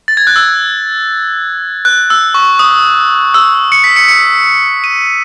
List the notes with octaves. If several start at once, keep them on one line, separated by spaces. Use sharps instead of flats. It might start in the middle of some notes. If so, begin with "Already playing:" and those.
A6
G#6
F#6
E6
F#6
E6
C#6
D#6
E6
C#7
B6
C#7
C#7
D#7